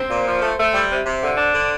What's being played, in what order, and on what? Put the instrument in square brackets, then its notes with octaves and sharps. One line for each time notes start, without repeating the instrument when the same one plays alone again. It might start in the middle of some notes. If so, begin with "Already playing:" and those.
Already playing: [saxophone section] C4 [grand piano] C5
[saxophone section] A#2
F3
A3
A3
G3
C3
C3
D3
D4
D3